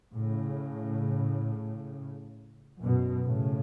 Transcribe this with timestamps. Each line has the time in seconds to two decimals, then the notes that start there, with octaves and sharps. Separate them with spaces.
0.14 A2 C#3
2.82 F#2 B2
3.26 A2 C#3